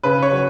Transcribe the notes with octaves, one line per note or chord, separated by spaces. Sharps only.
C#3 B4
C#5
F#3